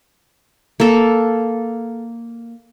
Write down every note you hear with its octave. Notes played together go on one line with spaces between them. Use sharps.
A#3 A4